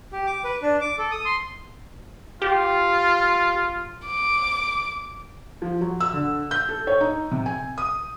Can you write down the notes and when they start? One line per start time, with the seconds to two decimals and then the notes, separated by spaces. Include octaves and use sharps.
0.12 G4
0.26 D6
0.44 B4
0.62 D4
0.81 D6
0.98 A4
1.11 D#6
1.25 C6
2.42 F4 G4
4.06 D6
5.62 F3
5.81 F#3
6.00 E6
6.13 D3
6.51 G6
6.69 A4
6.87 C#5
7.01 D#4
7.31 C3
7.46 G#5
7.78 D#6